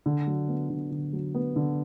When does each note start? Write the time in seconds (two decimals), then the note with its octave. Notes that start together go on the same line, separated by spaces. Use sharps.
0.06 D3
0.27 F#3
0.48 B3
0.70 D3
0.91 D3
1.13 F#3
1.35 B3
1.56 D3